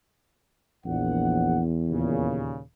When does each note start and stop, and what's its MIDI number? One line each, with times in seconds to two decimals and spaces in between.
0.85 1.60 34
0.85 2.52 40
0.85 1.60 78
1.89 2.60 39
1.89 2.60 46
1.89 2.60 49